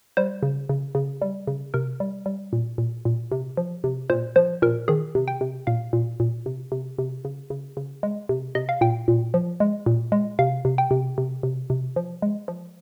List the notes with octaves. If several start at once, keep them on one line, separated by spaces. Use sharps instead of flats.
G3 C5
C#3
C#3
C#3
G3
C#3
C3 A#4
G3
G3
A#2
A#2
A#2
C3
F3
C3
A#2 C5
F3 C5
A#2 A#4
D#3 G#4
C3
G5
C3
A#2 F5
A#2
A#2
C3
C3
C3
C#3
C#3
C#3
G#3
C3
C3 D#5
F5
A#2 G5
A#2
F3
G#3
A#2
G#3
C3 F5
C3
G5
C3
C3
C3
C3
F3
G#3
F3